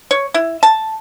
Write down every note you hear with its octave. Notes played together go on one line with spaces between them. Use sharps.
C#5
E4
A5